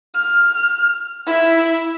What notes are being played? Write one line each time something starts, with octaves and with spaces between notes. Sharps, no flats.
F6
E4 E5